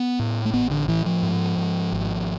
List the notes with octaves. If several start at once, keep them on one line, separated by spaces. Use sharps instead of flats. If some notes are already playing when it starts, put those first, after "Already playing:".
Already playing: B3
A2
A3
A1 B3
D3
A2 E3
F3
G#2
G#2
G#1